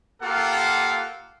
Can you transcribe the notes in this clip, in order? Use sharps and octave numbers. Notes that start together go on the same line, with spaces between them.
A#3 F4 G4 A4 F5 F#5